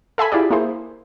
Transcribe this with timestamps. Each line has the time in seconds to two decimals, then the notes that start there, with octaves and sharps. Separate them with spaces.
0.18 A4 E5 G#5 B5
0.32 E4 F4 G4 G#4 D5
0.50 A#3 E4 G#4 C5